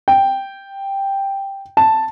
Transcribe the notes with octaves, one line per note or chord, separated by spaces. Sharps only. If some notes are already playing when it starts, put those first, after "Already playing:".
G5
A5